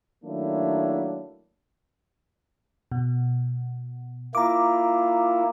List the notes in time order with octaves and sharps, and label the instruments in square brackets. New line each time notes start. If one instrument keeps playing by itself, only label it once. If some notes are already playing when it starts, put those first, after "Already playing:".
[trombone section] D#3 F#3 A3 A#3 D4 E4
[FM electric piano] B2
[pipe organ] A#3 E4 F4 [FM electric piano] A#5 D6